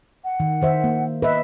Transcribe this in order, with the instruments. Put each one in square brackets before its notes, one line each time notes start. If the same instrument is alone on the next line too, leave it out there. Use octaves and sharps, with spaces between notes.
[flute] F#5
[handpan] D#3
D#3 C5 E5
A#3
[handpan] B4 E5 [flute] D#5